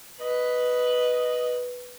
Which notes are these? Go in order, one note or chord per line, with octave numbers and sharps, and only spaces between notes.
B4 D#5